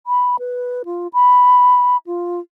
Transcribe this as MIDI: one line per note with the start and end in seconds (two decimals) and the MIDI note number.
0.07 0.36 83
0.39 0.83 71
0.85 1.08 65
1.13 1.97 83
2.07 2.40 65